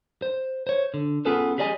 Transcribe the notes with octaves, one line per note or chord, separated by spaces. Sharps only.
C5
C5 C#5
D3
B3 C#4 F4 G#4 A4 B4
G4 G#4 D5 D#5 G#5